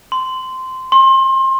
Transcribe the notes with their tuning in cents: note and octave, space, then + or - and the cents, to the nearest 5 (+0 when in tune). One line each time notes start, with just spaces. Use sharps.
C6 -15
C6 +30